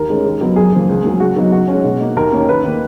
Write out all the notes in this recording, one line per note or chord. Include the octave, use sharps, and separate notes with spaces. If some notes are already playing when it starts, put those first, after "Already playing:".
Already playing: D#2 A#4
D#3 G#3 C#4
D#2
C#3 F#3 B3 D#4
F#2 G#4
C#3 F3 A#3
C#2
C#3 F#3 A#3
C#3 F#4
F#3 B3 D#4
C#3 F#4
C#4
G#3
B2
A#3 D#4
D#2 A#4
D#3 A#3 C#4
D#2 B4
D#3 A#3